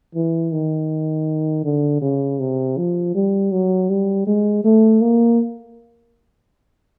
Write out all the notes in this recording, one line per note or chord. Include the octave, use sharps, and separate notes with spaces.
E3
D#3
D3
C#3
C3
F3
G3
F#3
G3
G#3
A3
A#3